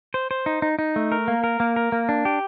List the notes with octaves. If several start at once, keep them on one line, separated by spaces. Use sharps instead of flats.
C5
C5
D#4
D#4
D#4
A3
A#4
A#3
A#4
A#3
A#4
A#3
D4
G4